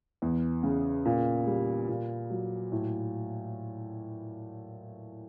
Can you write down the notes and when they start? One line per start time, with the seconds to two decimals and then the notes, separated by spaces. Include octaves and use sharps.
0.22 E2
0.63 C#3
1.05 A#2
1.47 G3
1.89 A#2
2.30 F#3
2.72 A2